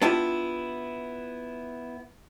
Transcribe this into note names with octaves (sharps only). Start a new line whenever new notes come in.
B3 D4 E4 F4 G4 B4